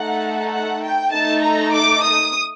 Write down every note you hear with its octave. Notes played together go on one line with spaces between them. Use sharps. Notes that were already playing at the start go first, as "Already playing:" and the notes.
Already playing: A3 D#4 A4 F#5
F#5
G5
A3 D#4 A4 A5
A#5
D6
D#6